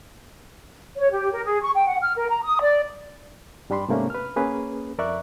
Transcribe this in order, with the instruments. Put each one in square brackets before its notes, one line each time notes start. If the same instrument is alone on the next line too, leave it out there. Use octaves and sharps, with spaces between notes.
[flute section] C#5
G4
A#4
G#4
C#6
G5
F#5
F6
A#4
A#5
D#6
D5
[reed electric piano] G2 G3 D4 B5 C6
G#2 C3 A3 A#3 C#4 D4
B4 F6
A#3 C#4 G#4 B4
F2 A#4 D5 E5 C#6 F#6